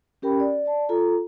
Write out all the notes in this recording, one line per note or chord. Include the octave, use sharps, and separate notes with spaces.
C#4 G4 A#4 G5 B5
D5
D5 A5
F4 A4 A#5